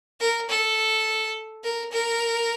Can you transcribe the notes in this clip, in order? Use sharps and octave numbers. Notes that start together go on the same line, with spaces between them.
A#4
A4
A#4
A#4